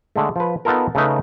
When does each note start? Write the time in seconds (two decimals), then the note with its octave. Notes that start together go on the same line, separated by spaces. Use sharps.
0.16 D3 G#3 A3
0.36 F3 B4
0.65 B3 D#4 F4 A4 A#4
0.95 C#3 A3 D#4 B4